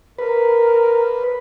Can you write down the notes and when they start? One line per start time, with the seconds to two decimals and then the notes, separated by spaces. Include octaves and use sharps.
0.19 A#4 B4